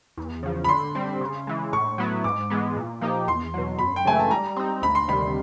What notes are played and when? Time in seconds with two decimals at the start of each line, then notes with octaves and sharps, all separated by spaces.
0.17 E2
0.43 C#3 F3
0.64 B5
0.69 D3 C6
0.95 G3 C4
1.21 C#3
1.47 E3 G#3
1.73 A2 C#6
1.98 F#3 B3 E4
2.24 G#2 D6
2.50 E3 G#3 B3
2.76 A#2
3.01 F3 A#3 D#4 G4
3.28 E2 C6
3.54 B2 F#3
3.79 F#2 B5
3.96 G5
4.05 C#3 E3 A3 G#5
4.19 A5
4.30 G3 A#5
4.56 C4 D#4
4.82 D2 B5
4.95 C6
5.08 C3 D#3 G3 B5